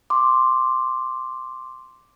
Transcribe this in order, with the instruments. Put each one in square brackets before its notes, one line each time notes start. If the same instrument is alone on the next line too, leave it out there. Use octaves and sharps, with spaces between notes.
[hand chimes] C6 D6